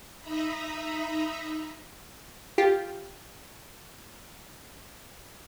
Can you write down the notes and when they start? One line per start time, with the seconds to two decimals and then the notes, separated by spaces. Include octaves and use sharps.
0.21 D#4 D#5 E5 A#5 B5
2.58 F4 G4